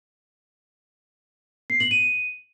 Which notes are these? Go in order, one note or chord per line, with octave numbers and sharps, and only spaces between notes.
C7
F#7
D#7